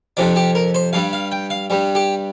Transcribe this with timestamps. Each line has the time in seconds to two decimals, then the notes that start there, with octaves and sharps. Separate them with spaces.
0.17 F2 C3 F3 D4
0.36 G4
0.55 A#4
0.74 C5
0.93 G2 G3 F5
1.13 F5
1.32 G5
1.50 F5
1.70 G2 G3
1.95 G4